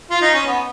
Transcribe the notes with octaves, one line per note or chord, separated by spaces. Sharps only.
F4
D#4
C#4
B3